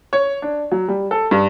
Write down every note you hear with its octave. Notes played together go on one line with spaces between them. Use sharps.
C#5
D4
F#3
G3
A4
G2